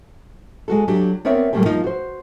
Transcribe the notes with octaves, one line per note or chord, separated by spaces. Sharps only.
G#3 F#4 A4
F#3 D4 F#4 G4
B3 C4 A#4 C#5 D5 E5
A#2 F#3 G3 A3 A#3 G5
F3 A#3 D#4 F4
F#4 C5